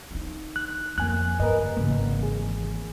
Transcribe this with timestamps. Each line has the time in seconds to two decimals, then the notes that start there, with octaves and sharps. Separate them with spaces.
0.11 D4 D#4
0.56 F#6
0.98 F2 A#3 G#5 F#6
1.40 G2 A#4 B4 D#5
1.77 G#1 C#3 E3 A#3
2.23 G#4